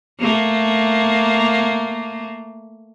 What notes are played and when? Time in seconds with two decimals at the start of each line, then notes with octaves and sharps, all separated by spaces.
0.19 A3 A#3